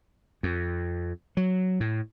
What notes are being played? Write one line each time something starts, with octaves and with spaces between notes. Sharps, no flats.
F2
F#3
A2